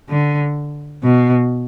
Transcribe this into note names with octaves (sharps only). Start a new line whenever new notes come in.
D3
B2